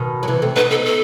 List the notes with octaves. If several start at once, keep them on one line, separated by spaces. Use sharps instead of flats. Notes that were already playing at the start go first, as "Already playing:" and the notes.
Already playing: B2 D#3
F#3
C3 E3
A3 C4
B3 D#4 B4
A4
A4